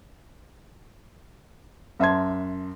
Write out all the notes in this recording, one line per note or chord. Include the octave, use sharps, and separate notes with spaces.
F#2 E5 A5 C6 G#6